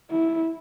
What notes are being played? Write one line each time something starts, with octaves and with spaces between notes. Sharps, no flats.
E4